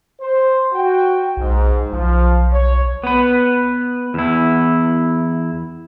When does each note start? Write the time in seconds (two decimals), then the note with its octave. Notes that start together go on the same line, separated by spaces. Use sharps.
0.21 C5
0.73 F#4 G5
1.37 B1 G#2
1.93 B1 F3
2.52 C#5
3.04 B3 B4
4.14 E2 E4